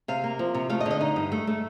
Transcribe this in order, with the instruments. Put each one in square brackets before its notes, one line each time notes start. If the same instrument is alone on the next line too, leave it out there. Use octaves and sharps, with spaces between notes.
[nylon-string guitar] C3 F5
A#3
F3
C3
A3 F5
D#5
D3
D#5
D#4
G2
A3
A3